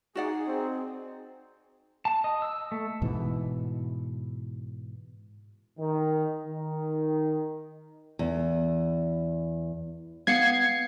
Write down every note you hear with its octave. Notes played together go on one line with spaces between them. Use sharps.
D#4 F#4 G#4 D5 F#5
C4
A5
D#5
E6
A3
G#2 B2 E3
D#3
D#3
E2
B3 F5 F#5 G#6 C7 C#7